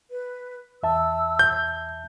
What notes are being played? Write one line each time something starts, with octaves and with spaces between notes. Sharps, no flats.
B4
E2 E5 A5 E6
G6